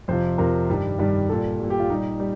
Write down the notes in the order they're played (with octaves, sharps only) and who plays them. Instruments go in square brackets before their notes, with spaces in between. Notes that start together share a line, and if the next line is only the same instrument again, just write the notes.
[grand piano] F2 C3 F3 C5
F2 C3 F3 A#4
G2 D#3 G3
G2 D#3 G3
A#2 G3 A4
A#2 G3
G4
F4
A#2 G3 D#4
G3